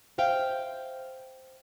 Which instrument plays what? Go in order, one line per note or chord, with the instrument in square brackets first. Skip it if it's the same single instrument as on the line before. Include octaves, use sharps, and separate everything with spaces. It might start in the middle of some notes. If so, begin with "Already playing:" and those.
[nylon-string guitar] C5 E5 F5 G5